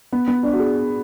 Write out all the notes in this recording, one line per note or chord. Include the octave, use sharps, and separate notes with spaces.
B3
B3
D4
F#4
G#4